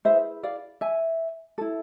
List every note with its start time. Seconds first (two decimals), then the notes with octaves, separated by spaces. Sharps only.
0.05 E4 G#4 B4 C5 E5
0.43 D5 F5
0.81 E5 G#5
1.58 E4 A4